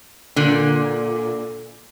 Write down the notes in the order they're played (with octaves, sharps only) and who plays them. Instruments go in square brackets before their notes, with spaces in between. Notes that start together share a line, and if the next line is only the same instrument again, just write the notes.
[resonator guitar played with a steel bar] A#2 D3